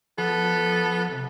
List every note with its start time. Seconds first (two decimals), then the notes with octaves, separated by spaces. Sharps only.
0.18 F3 B3 A4
1.08 C3